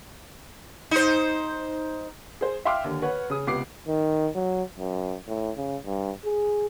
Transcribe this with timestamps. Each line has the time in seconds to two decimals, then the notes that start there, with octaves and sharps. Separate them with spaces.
0.91 D#4 C5
2.41 G#4 C5
2.65 E5 F5 G5 C6 D6 F6
2.84 D#2 D3
3.02 B4 C#5 F#5
3.30 C#3 G#4 D#6
3.47 C#2 C3 B3 D6 C7
3.88 D#3
4.35 F#3
4.76 F#2
5.28 A2
5.57 C#3
5.85 G2
6.25 G#4